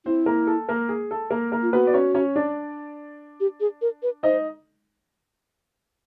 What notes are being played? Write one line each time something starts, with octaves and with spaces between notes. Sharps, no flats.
C4 E4 C5
A#3 A#4
A4
A#3 A#4
G#4
A4
A#3 A#4
A#3 A#4
F4
B3 F#4 B4
D5
C#4 C#5
C#4 C#5
D4 D5
G4
G#4
A#4
B4
D#4 C5 D#5